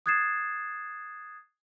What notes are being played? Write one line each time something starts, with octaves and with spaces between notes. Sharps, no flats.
D#6 F#6 G#6 A6 C7 E7